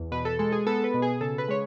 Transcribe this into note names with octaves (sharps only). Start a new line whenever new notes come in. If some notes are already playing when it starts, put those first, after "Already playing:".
Already playing: E2
B2 B4
A4
G#3 A4
G#4
B3 A4
B4
B2
G#4
C#3 A4
B4
G#3 C#5